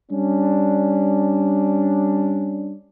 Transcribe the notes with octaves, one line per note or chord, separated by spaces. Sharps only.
G3 C#4 D4